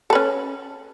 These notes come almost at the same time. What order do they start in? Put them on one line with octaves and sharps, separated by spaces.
A4 B4 C#4